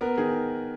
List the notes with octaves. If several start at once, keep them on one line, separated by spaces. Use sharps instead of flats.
B3 A#4
D#3 G#4